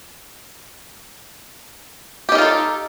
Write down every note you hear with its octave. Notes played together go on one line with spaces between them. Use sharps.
D#4 F4 G4 A4 A#4